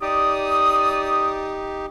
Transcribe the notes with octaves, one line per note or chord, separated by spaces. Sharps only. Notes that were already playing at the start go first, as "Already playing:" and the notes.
D#4 G4 D5 D#6